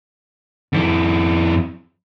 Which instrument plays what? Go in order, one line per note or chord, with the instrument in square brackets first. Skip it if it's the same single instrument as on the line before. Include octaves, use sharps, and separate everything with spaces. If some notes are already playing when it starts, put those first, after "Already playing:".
[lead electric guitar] F2 E4